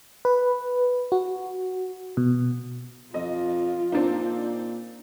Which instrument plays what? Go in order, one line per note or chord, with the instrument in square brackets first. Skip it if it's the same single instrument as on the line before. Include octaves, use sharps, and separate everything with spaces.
[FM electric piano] B4
F#4
B2
[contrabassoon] F2 [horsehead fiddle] F4 [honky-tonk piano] D#5
[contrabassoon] A#2 [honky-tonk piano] C4 D4 D#4